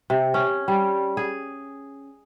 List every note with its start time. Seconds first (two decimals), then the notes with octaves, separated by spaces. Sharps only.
0.10 C3
0.34 C#4
0.68 G3
1.17 G#4